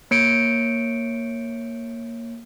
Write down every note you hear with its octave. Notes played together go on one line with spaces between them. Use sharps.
A#3 C#5 C#7 D7